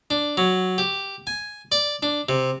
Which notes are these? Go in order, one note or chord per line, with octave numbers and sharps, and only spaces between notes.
D4
F#3
G4
G#5
D5
D4
C3